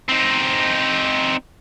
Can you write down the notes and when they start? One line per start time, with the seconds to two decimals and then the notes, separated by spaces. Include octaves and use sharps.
0.09 C4 D#4